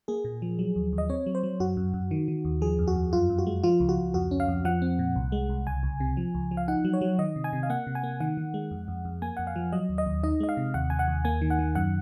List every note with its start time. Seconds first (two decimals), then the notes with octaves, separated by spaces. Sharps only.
0.08 A#3 G#4
0.25 A#2
0.42 F3
0.59 F#3
0.76 D#2
0.93 D#2
0.98 D#5
1.09 C4 C#5
1.26 F#3
1.35 C5
1.43 F#3
1.60 F#2 F#4
1.77 F#2
1.94 F#2
2.11 D#3
2.28 D#3
2.45 D#2
2.61 F3 G#4
2.79 F2
2.88 F#4
2.96 F2
3.13 F#2 F4
3.30 F#2
3.38 F#4
3.47 G#3
3.63 F3 F4
3.80 C#2
3.89 F#4
3.98 C#2
4.14 F2 F#4
4.31 C#4
4.40 F5
4.48 F2
4.65 F3 F#5
4.82 C4
4.99 A#2
5.16 C2
5.32 G#3
5.49 C2
5.67 C#2 G#5
5.83 C#2
6.00 C3
6.17 F3
6.35 C#2
6.51 F3
6.57 F5
6.68 D#4 F#5
6.85 F#3
6.93 C#5
7.01 F#3
7.19 D#3 D#5
7.36 C3
7.44 G#5
7.53 C3
7.63 F5
7.70 A#3 F#5
7.87 C3
7.95 G#5
8.04 A#3
8.20 D#3 F#5
8.37 D#3
8.54 G#3
8.71 F2
8.88 F2
9.05 F2
9.22 A#3 G#5
9.37 F2 F#5
9.47 F5
9.56 F3
9.72 F#3 D#5
9.89 D#2
9.98 D#5
10.06 D#2
10.23 D#4 D#5
10.40 G#3 D#5
10.49 F5
10.57 C3
10.74 D#2 F#5
10.90 D#2 G#5
10.99 F#5
11.08 D#2
11.25 A#3 G#5
11.41 D#3
11.50 F#5
11.59 D#3
11.75 F#2 F#5